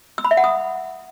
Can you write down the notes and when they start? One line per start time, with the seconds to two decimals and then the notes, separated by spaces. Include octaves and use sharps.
0.18 E6
0.25 B5
0.31 E5
0.37 F#5
0.44 D#6